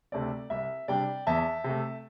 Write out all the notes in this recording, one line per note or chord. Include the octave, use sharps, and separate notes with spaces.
D2 C3 A3 C4 D5
C2 E5
C3 G3 D4 D5 G5
E2 E5 A5
C3
A3